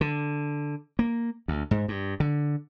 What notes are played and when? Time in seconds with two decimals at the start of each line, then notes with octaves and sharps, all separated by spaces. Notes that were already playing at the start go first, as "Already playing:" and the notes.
0.01 D3
0.99 A#3
1.48 D2
1.71 G#2
1.88 G2
2.20 D3